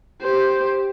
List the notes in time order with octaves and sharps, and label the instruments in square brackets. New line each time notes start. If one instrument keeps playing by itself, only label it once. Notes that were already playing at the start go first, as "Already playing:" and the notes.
[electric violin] G4 C5